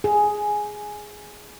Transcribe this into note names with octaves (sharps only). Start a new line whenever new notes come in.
G#4